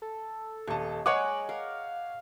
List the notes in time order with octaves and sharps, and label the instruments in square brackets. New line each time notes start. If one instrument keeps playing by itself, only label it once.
[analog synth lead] A4
[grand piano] D#1 A5 [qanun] C#5 D#5
[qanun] G#3 G#4 A#4 [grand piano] C#5 F#5 D6 [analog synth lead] F#6
[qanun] A#4 [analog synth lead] F5